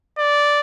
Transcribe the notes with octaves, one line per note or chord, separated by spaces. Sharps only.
D5